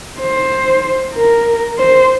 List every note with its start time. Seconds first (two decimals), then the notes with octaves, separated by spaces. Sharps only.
0.21 C5
1.15 A#4
1.79 C5